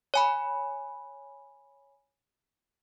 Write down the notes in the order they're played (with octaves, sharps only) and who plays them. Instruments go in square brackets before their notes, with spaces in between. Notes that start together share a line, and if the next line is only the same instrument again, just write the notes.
[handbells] C#5 G#5 B5